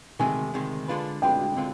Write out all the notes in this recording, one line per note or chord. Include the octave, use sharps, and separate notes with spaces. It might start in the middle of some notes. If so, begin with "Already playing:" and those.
D2 C3 D#3 G#3 G#5
D2 C3 D#3 G#3
D3 G#3 D4 F4 B4
D3 G#3 D4 F4 B4 G5
D3 G#3 C4 F4